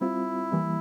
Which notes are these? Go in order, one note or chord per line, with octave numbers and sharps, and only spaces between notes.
G3 C4 E4 F4
E3 G3 A#3